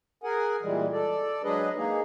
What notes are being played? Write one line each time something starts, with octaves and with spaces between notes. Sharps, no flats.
G#4 A#4 F#5 G#5
A#2 E3 G3 G#3
A4 D5
F#3 G#3 D4 G#4 B4 D#5
A#3 D#4 G#4